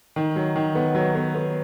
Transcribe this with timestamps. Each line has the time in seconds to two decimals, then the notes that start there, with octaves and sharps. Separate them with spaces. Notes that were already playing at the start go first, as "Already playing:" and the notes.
0.16 D#3
0.36 F#3
0.56 D#3
0.75 B3
0.95 F#3
1.15 B3
1.35 B3